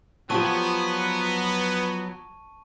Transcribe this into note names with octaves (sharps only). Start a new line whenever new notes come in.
F3 F#3 B3 F4 G4 A5 C#6 D#7